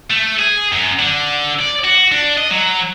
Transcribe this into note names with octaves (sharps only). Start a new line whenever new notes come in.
A3
G#4
F#2
D3
D5
F#4
D4
D#5
F#3